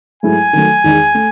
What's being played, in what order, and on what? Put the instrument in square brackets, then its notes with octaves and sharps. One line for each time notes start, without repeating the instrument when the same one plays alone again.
[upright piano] G#2 F#3 A3 E4 [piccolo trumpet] G#5
[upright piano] D#3 F#3 A3
E2 D#3 G#3 D#4
A3